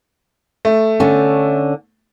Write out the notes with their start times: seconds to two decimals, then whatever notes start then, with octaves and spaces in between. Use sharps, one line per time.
0.65 A3
1.00 D3 C#4